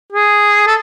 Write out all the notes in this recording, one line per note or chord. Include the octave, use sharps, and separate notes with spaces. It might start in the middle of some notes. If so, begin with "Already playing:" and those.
G#4
A4